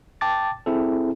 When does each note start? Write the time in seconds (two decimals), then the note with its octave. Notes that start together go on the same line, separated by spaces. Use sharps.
0.21 G5 A5 D6 A6
0.66 C4 E4 G#4 A4